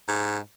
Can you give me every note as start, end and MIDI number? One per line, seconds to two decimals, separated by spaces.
0.08 0.38 44